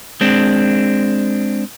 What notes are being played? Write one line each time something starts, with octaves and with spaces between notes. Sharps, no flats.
G#3 C4 D4